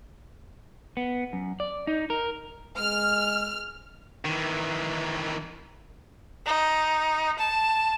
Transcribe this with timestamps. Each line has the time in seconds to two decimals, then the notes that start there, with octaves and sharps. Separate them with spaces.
0.97 B3
1.33 F#2
1.60 D5
1.87 D#4
2.10 A#4
2.78 G#3 F6
4.25 D#3 E3
6.46 D#4
7.39 A5